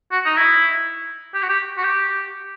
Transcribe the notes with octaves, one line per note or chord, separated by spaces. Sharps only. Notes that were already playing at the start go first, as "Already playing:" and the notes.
F#4
D#4
E4
G4
F#4
G4
F#4
G4